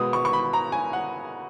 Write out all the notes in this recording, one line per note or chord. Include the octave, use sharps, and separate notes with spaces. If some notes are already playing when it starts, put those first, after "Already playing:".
Already playing: B2 G#3 B3 D#6
C#6
C#6
B5
A#5
G#5
F#5